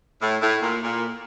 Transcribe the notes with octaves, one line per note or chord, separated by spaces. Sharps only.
A2
A2
A#2
A#2